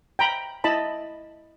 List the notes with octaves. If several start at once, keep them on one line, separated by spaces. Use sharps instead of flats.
G5 A#5 B5
E4 D#5 A5 B5